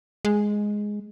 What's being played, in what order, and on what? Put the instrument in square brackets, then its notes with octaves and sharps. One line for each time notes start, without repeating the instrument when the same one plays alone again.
[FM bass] G#3